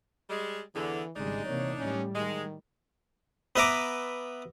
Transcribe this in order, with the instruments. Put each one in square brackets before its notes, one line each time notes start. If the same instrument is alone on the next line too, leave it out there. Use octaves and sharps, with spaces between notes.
[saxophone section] G3 G#3
[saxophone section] E2 D3 [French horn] E3
[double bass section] G#1 C#3 G3 [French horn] G#3 [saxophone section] D4 D#4
[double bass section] C3 E3 A#3 [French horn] C#5
[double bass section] A2 G3 [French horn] C#4
[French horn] D#3 [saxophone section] G#3
[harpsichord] B3 B4 E5 A#5 D6